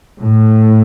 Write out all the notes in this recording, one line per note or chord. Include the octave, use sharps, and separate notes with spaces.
A2